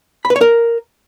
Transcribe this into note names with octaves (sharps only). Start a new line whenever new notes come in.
B5
B4
C#5
A#4